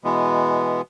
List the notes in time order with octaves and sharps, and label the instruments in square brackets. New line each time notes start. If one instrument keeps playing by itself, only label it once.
[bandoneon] B2 E3 G#3 B3